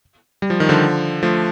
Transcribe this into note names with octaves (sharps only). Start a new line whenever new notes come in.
G3
F3
D#3
D3 F3
F3 A3